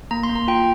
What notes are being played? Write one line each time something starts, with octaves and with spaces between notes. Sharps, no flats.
A#3 A#5
C6
A#3
A#5
F4 G5